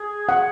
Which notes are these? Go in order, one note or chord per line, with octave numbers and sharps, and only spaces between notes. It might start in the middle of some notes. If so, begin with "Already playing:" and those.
Already playing: G#4
F#5